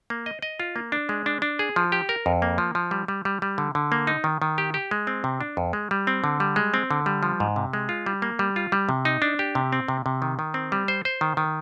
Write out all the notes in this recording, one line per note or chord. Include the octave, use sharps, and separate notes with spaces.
A#3
D#5
D#5
F4
A#3
D4
G#3
D4
D4
G#4
F3
G4
A#4
F2
A#3
F3
F3
G3
G3
G3
G3
D3
D3
A#3
D#4
D#3
D#3
G4
G4
G#3
C4
C3
D4
F2
G#3
G3
C4
D3
G3
G#3
C4
D3
G3
F3
G#2
C3
G#3
F4
G3
A#3
G3
F4
G3
C3
D#4
D4
G4
C3
C4
C3
C3
D#3
D#3
C4
G3
C5
C5
D#3
D#3